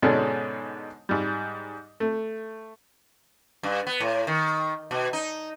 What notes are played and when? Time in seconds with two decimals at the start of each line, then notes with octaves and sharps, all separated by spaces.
0.02 G#2 B2 D3 G#3 C#4 D4
1.09 G#2 G3
2.00 A3
3.63 G2
3.87 B3
4.00 A2
4.27 D#3
4.91 B2
5.13 D#4